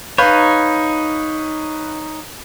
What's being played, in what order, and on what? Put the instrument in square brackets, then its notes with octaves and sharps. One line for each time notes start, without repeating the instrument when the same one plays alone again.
[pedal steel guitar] D#4 C#5 [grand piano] B4 F5 G6